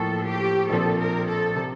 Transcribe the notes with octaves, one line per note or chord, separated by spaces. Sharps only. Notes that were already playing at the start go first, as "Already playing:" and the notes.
Already playing: A2 F3 A#3 A4
G4
A#1 A#2 F3 C4 A4
A#4
A4
C3